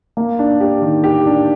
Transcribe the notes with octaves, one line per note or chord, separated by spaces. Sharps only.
A#3
D4
G4
D#3
G4
D4